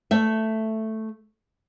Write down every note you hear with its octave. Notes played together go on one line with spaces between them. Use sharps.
A3 E5